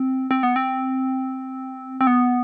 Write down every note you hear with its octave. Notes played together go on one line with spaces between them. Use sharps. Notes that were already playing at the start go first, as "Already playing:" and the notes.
Already playing: C4
C4
B3
C4
C4
B3